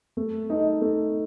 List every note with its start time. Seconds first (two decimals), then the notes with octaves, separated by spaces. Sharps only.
0.17 A3
0.50 D#4 A4 D#5
0.81 A3